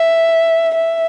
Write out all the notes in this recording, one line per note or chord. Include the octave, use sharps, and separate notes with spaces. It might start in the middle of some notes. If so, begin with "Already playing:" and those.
Already playing: E5
E5